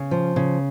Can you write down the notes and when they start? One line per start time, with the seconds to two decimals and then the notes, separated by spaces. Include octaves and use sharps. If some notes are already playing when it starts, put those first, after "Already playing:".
Already playing: C#3
0.11 F3
0.36 C#3